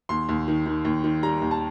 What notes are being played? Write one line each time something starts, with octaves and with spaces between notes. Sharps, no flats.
D#2 C6
D#2
D#3
D#3
D#2
D#3
G3 A#5
D#2
A5